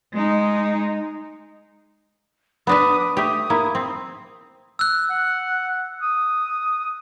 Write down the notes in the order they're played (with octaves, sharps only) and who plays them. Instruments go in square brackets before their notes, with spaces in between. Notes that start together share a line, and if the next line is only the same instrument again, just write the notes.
[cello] G#3 D#4
[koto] B3 D4 B4 [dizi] D#6
[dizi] D6
[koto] A3 G4 [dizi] D#6
[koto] A#3 E4
C4
[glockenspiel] E6 F#6
[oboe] F#5
D#6